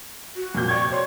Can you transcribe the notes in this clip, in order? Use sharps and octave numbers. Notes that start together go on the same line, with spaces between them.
F#4
F2 A#2 G6
D5 G5 C#6 G#6
C5 C#5 C6